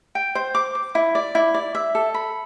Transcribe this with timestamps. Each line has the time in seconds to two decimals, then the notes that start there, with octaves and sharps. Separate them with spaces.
0.15 G5
0.35 C5
0.55 D6
0.75 D6
0.95 E4
1.15 D5
1.35 E4
1.54 D5
1.75 E5
1.95 A4
2.14 B5